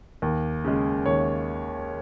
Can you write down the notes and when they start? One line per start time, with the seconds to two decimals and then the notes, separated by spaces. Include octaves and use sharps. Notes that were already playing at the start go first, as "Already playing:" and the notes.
0.22 D#2
0.65 C#3 G#3
1.06 D#2 C#5